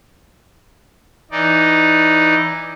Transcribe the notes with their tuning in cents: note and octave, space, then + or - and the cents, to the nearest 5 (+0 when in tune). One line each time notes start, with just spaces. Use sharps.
E3 +0 D#4 +0 D5 +0